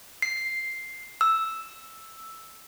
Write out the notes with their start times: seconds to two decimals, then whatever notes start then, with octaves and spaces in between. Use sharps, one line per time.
0.22 C7
1.21 E6